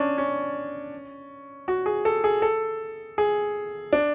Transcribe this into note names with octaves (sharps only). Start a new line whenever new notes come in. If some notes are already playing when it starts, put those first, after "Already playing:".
Already playing: C#4 D4
C#4
F#4
G#4
A4
G#4
A4
G#4
D4